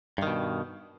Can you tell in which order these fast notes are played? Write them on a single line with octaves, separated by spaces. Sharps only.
G2 D#3 B2